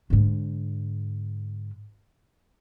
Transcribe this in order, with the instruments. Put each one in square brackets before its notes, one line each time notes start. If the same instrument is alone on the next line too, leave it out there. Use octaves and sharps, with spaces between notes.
[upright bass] G#2 D3